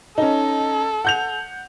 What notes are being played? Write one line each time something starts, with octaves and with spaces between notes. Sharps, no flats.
C#4 D#4 A4
F#5 G6 F7